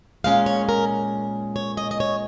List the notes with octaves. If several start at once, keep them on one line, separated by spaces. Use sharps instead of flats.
A#2 G#3 C#4 F5
C#5
A#4
C#5
D#5
D#5
C#5